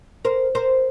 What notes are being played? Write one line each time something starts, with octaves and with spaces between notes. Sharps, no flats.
A#4 C5
A#4 C5